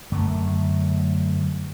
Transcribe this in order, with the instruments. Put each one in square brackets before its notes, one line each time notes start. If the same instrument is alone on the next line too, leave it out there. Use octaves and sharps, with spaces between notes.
[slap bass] F#2 D3 A3